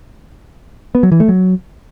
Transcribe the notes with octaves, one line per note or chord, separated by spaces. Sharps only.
B3
F#3
E3
A3
F#3